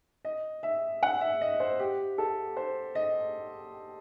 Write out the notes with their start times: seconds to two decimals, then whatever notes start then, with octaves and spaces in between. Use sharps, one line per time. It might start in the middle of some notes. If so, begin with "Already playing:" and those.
0.25 D#5
0.63 E5
1.03 F#5
1.21 E5
1.41 D#5
1.60 C5
1.79 G4
2.18 A4
2.57 C5
2.95 D#5